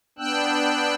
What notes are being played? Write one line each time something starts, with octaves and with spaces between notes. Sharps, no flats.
B3 D4 G5 E6 F#6